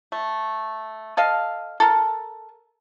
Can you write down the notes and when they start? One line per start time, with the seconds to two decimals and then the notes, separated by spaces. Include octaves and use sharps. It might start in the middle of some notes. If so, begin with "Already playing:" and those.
0.12 A3
1.17 A4 D#5 F5
1.80 A4 A#4